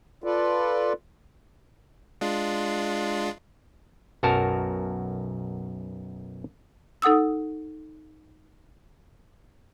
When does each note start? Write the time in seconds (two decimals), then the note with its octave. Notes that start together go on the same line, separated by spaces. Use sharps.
0.24 F4 A4 B4 D5
2.21 G#3 D4 F4
4.23 B1 F#2 F#4 A#4 A5 A#5
7.02 D#4 A4 F#5 D#6 E6